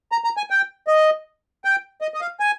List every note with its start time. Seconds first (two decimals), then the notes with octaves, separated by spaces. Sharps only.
0.12 A#5
0.24 A#5
0.37 G#5
0.50 G5
0.88 D#5
1.65 G5
2.01 D#5
2.14 D#5
2.21 F5
2.40 G#5